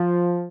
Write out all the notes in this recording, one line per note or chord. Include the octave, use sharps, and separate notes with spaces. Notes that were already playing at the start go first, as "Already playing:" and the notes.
Already playing: F3